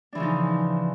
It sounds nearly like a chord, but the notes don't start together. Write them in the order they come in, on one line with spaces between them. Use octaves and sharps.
D4 E3 C#3 F3 D#4